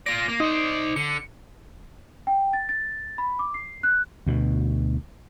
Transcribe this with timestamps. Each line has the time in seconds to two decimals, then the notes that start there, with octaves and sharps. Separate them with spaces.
0.06 F4 D5 A#6
0.28 A#3
0.40 D#4 C5 D5
0.96 D3 C#7
2.27 G5
2.53 A6
2.69 A6
3.18 B5
3.39 D6
3.54 C7
3.83 F#6
4.27 D2 B2